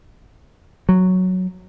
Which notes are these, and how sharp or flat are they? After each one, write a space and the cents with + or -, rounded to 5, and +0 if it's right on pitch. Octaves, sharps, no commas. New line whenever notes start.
F#3 -5